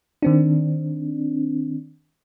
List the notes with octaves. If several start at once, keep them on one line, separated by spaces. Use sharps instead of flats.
D#3 C4 D4